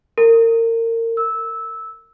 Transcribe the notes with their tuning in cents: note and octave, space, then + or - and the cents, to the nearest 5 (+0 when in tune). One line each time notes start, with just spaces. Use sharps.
A#4 -30
E6 -15